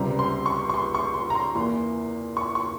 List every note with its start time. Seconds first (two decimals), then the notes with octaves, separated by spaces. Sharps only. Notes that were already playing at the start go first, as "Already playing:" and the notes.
Already playing: C#2 C3 G3 C4 A#5
0.19 C6
0.46 C#6
0.70 C#6
0.74 C6
0.95 C#6
1.14 C6
1.30 A#5
1.35 C6
1.55 E2 E3 A#3 C6
2.37 C#6
2.55 C#6